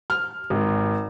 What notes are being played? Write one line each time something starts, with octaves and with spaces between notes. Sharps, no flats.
F6
G#1